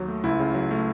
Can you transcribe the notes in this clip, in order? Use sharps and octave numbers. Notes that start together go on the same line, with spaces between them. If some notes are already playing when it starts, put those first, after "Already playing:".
Already playing: D#2 F#3
A3
C#2 E4
C#3
F#3
A3